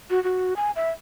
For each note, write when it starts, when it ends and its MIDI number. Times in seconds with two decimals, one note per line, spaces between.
0.10 0.22 66
0.24 0.54 66
0.56 0.71 80
0.76 0.90 76